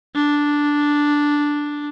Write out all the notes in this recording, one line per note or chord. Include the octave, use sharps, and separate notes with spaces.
D4